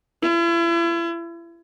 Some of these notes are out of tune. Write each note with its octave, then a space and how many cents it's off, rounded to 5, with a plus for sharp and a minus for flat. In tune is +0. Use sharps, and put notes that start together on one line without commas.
E4 +40